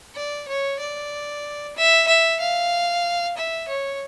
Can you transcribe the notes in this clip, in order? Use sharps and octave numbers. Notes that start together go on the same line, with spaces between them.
D5
C#5
D5
E5
E5
F5
E5
C#5